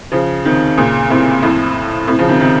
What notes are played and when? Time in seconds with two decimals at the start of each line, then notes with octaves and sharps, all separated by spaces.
0.12 C#3 F3
0.45 C3 D#3
0.77 A#2 C#3
1.09 A2 C3
1.42 F2 A2
2.07 A2 C3
2.19 C#3 F3
2.29 C3 D#3
2.40 C3 D#3